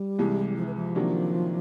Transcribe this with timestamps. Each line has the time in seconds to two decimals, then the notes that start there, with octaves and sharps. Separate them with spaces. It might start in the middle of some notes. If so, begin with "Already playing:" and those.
Already playing: G3
0.19 C2 C3 E3 G#3
0.57 F3
0.66 E3
0.75 F3
0.95 C3 D#3 F#3 A#3 D4